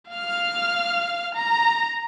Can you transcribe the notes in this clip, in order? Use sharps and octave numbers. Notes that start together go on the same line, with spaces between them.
F5 F6
A#5